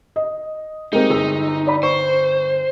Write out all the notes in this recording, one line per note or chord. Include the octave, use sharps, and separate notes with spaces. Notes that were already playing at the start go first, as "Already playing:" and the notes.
D#5
G#3 A#3 C4 D#4 G4 A#4
G1 G#4 E6
D5 B5
C5 C#6